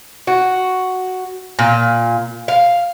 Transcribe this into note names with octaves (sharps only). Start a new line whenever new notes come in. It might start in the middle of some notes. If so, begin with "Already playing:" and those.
F#4
A#2
F5